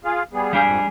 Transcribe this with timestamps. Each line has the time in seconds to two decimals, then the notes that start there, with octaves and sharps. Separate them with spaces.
0.05 F4 G#4 F5
0.33 G3 B3 G#4
0.53 G3 D4 G#4 F5 G6
0.64 F2 G#2